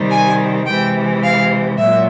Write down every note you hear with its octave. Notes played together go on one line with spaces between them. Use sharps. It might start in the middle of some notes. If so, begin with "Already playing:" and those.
Already playing: C3 D#3 G3
G#5
C3 E3 G#3 G5
F5
A#2 F#3 E5